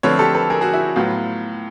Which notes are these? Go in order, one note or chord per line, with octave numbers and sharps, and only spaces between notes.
D3 F3 A3 C4 B4 C#5
G4 A4
A4 B4
G#4 A#4
F#4 G#4
E4 F#4
A2 F#3 B3 F4